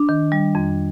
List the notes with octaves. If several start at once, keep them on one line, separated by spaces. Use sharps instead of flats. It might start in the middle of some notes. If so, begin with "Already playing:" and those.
Already playing: D4
D#3
G3
F2